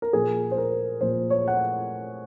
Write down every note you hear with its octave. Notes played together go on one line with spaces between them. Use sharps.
A#4
A#2 F3 G#4
C5
A#4
A#2 F3 C5
C#5
F#5